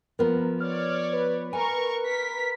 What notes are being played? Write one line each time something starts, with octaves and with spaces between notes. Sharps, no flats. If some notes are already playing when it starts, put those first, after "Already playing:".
F3 B3 A#4
C#5 D5 F6
B4
A#4 G#5 C#6
A#4 B6